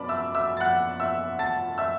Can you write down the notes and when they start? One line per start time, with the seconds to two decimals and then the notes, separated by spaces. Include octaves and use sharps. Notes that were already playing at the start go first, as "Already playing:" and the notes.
Already playing: F#2 B3 D5 A5 B5 D6
0.08 E5 E6
0.35 E5 E6
0.57 A6
0.60 F#5 F#6
1.00 E5 E6
1.39 A5 A6
1.78 E5 E6